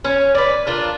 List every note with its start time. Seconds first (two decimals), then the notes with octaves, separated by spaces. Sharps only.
0.05 C#4
0.35 B4 D5
0.67 D4 F4 A#4